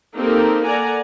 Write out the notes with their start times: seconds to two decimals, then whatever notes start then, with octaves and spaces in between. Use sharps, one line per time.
0.16 A#3 C4 D#4 G4 A4 A#4
0.66 A4 D5 F#5 G#5 A#5